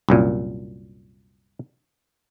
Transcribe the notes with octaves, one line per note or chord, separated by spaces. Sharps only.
C2 F#2 A#2